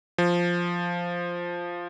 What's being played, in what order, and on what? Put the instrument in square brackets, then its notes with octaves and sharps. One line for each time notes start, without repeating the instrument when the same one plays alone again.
[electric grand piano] F3